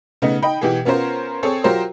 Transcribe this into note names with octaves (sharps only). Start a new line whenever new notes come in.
C#3 A3 B3 D#4
D#4 G5 B5
B2 E3 G4 G#4
B3 C#4 F4 A#4 C5
C4 G#4 A4 C#5
F#3 F4 G4 A#4 C5